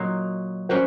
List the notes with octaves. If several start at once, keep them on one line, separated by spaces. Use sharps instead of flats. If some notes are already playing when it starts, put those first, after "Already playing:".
Already playing: A#2 F#3 A#3 D#4
G3 A#3 C#4 F#4 A#4 C5